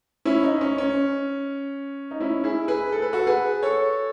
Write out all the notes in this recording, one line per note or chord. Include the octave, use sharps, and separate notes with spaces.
C#4 E4
D#4
C#4
C#4
D#4
C#4 E4
E4 G#4
G#4 B4
A4
B4
F#4 A4
G#4 B4
A4 C#5